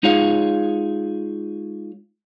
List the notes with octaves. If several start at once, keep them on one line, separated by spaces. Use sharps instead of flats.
G#3 D#4 F4 G#4 C#5 F5